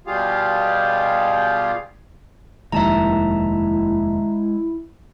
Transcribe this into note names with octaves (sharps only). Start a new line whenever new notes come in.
B2 G3 F4 G4 G#4 F5
F1 D#2 G#3 E4 E5 A5 A#5